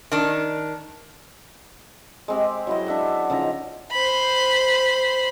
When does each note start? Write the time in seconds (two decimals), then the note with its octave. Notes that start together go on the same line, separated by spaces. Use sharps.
0.12 D#3 D4
2.28 G#3 C4 G4
2.67 F#3 E4 D#5
2.86 D4 E5 F#5
3.30 C#3 F3 D#4 A#5
3.92 C5 B5